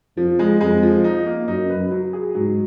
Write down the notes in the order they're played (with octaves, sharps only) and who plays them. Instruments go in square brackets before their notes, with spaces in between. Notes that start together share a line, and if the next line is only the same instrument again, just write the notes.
[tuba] F2 [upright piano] F3
[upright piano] G#3
[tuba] F2 [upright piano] G#3
[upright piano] F3
D#4
A#3
[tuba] F#2 [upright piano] D#4
[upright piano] B4
F#3
G#4
[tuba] G#2 [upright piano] F#3